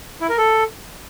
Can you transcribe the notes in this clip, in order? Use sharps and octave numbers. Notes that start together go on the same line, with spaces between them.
E4
A#4
A4